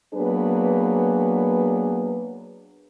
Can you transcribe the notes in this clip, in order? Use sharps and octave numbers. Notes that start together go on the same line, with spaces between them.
F#3 A#3 B3 D4 G#4 B4